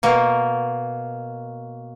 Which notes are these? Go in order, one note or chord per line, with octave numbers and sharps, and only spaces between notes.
B2 A#3